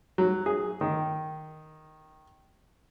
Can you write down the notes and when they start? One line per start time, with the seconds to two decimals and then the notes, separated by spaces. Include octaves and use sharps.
0.18 F#3
0.46 G#4
0.81 D#3